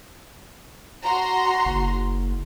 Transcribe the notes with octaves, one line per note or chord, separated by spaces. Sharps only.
F#4 A#5 C6
F#1